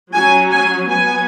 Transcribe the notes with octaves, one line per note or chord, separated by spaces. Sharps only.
F#3 C#4 G#5
G#5
F#3 B3 G#5